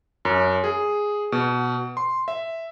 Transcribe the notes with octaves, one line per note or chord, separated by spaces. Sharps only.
F#2
G#4
B2
C6
E5